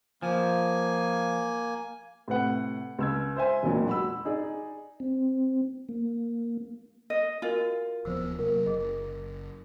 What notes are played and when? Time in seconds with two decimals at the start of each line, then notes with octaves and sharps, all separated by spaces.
0.22 F3 A#3 G#5
2.28 A2 C3 B4 F#5
2.98 C#2 E6 G#6
3.37 C5 E5 G#5
3.63 E1 A1 A#2 F#3
3.87 F#4 B5 E6
4.25 D#4 G#4 D5
5.00 C4
5.89 A#3
7.10 D#5
7.42 F4 F#4 A#4 G#5
8.05 D#1 F3 B3 C5 E6
8.39 C3 F#3 A#3 A#4 F5
8.66 F#1 G#4 D#5